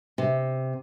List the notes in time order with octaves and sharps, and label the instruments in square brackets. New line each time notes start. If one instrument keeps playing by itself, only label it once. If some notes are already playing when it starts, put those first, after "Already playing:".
[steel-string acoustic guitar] C3